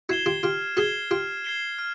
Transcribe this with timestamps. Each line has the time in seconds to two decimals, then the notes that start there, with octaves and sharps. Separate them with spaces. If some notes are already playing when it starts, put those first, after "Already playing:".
0.09 E4 F#4 G#6 C7 E7 G7
0.26 F4 G4
0.43 F4 G4 F6
0.77 F#4 G#4 G#6 C7 E7 G7
1.11 F4 G4 F6
1.44 G#6 C7 E7 G7
1.78 F6